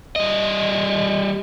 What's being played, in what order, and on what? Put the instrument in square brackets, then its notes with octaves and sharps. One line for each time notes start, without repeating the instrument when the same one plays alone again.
[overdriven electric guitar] G3 D#5